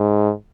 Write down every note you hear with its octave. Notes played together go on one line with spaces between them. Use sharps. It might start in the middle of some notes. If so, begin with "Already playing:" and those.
Already playing: G#2